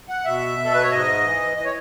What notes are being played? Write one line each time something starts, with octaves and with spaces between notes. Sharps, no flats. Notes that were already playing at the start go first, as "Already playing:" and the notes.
F#5
B2 E5
B2
A4
B4
C#5
G#2 D#5
E3
E3 D#5
C#5